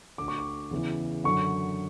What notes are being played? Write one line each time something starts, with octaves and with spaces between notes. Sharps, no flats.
D2 D3 D6
C#6
D6
E2 C#3 E3
F#2 D3 C#6